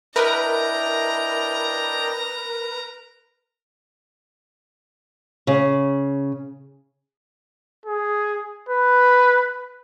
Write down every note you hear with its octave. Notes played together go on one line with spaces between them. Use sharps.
D4 E4 A#4 B4 D#5 G5 A#5
C#3
G#4
B4